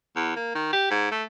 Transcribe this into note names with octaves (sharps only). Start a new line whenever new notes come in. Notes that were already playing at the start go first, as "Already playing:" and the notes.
E2
A#3
D#3
G4
G#2
A3